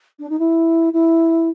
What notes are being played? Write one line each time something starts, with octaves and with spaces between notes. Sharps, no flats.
D4
D#4
E4
E4